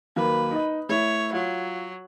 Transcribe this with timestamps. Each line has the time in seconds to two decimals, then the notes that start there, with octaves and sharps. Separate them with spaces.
0.16 D#2 F#3 A#3 B4
0.51 D#4 D#5
0.89 A3 E4 C#5
1.33 F#3 F4